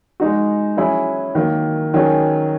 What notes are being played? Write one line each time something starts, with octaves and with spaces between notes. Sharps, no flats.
G#3 D#4 F#4
F#3 C#4 E4 G#4
D#3 F#3 A#3
D#3 F#3 C#4 G#4